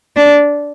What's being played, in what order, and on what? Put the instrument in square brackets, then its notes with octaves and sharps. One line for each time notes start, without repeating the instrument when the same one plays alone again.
[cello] D4